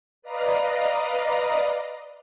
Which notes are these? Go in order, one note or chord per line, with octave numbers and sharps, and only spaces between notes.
B4 D5 D#5 F5 A#5